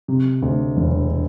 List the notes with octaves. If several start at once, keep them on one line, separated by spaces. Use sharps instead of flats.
C3
D2
E1